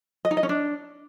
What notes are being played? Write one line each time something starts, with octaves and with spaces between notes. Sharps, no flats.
D#5
D#4
D#5
C#4
D4